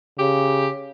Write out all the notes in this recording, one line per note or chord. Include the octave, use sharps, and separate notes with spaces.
C#3 G4